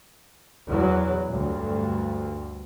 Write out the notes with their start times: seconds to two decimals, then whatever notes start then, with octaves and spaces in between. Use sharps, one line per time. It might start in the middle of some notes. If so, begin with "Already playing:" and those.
0.68 E2 F#3
1.29 D2 G2